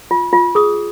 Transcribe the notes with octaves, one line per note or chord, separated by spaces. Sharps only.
F4
F4
G#4 D#6